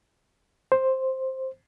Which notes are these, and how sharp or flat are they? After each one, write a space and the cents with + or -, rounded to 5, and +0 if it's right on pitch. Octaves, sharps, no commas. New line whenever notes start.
C5 +5